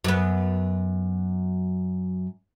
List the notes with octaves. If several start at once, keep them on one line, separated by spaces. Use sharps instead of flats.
F#2 B3